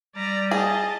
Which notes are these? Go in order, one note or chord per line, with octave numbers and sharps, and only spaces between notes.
G3 D5 A#5
G#4 D#5 A5